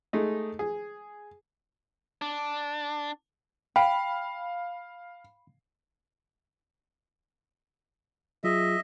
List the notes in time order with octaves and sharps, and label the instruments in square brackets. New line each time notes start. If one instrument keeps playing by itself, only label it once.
[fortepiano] G#3 A3 D#4
G#4
[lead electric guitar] D4
[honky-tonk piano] F5 [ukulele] G5 [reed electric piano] B5
[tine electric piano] F#3 F4 G#4 [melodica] D#5 E5